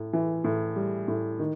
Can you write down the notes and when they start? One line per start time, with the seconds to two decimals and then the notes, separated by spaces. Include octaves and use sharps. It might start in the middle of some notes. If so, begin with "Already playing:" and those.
Already playing: A2
0.13 E3
0.44 A2
0.76 G3
1.08 A2
1.39 D#3